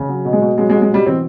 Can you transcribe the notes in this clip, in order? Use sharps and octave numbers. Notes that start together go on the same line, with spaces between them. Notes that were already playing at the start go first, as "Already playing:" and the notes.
Already playing: C#3
F#3
B2
G#3
B2
F#3 G#3
G#3
F#3
G#3
B2 G3
E3 C4